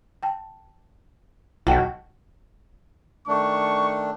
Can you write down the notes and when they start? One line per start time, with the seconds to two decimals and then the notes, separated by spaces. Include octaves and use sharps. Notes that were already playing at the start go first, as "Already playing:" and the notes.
0.23 G5 A5
1.67 B1 F#4 D#5 G5 A5
3.27 D#3 A3 D4 C#6